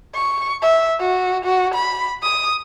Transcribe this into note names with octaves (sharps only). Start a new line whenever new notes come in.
C#6
E5
F#4
F#4
B5
D#6